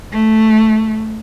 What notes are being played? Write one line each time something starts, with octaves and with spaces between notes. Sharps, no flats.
A3